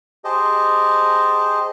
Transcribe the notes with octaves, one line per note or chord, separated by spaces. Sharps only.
G4 G#4 C5 D#5 A5